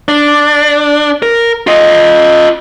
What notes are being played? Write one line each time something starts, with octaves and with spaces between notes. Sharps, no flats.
D4
A#4
F4 D#5